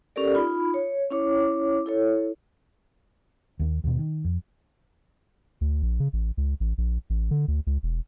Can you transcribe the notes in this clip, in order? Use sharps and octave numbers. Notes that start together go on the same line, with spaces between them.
C#4 G4 A4 A#4 D5
D#4 F4 B5
C#5
C#4 E4 C#5 D6
E4 A4 C#5
D#2 A#3
D#2 B2
D#3
F2
D2
A#1
C#3
A1
C#2
A1
A#1
A1
D3
D2
C#2
E1